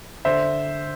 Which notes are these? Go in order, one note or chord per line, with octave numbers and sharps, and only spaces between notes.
D3 C5 E5